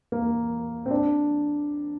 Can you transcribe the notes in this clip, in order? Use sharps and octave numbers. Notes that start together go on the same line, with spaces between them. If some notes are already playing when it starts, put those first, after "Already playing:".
A#3
C4
D4